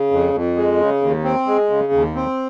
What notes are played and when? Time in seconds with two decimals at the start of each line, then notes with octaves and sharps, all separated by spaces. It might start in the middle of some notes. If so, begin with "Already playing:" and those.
Already playing: C#3
0.11 F2
0.34 F2
0.56 G#3
0.79 C#3
1.02 D#2
1.24 C4
1.47 G#3
1.70 C#3
1.93 D#2
2.15 C4